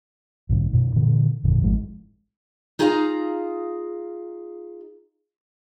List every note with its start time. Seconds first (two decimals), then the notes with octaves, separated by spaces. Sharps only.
0.49 B1 G#2 D3
0.73 F#2 B2
0.96 A#2 D3 E3
1.44 G1 F2 A#2 D3
1.61 G#1 F3 G#3
2.79 D#4 F4 G#4 F5 F#5 A#5